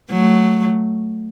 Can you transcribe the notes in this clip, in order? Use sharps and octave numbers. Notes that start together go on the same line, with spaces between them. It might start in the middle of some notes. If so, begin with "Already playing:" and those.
F#3 A3